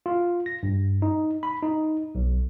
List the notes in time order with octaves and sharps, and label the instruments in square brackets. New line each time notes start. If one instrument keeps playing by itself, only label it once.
[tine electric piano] F4
A#6
G2
D#4
B5
D#4
B1